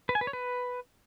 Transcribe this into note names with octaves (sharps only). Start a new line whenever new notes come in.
B4
G#5
B4
C#5
B4